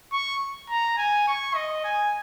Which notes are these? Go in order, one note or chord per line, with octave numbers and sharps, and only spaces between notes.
C#6
A#5
G#5
C#6
D#5
G#5